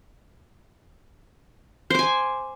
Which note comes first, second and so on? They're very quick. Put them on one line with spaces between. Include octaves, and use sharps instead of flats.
C5 D6 G#5